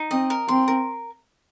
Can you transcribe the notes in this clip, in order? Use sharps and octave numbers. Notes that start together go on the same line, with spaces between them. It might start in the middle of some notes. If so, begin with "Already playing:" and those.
Already playing: D#4
C4 D#5
A#4
C4 C6
A#4